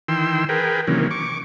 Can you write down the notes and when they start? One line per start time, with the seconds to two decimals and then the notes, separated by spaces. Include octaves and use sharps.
0.08 D#3 E3 G5 C6 E6
0.49 G#4 A#4 B4 G5
0.87 C3 D#3 E3 F#3 A#3 C#4
1.11 C#6 D6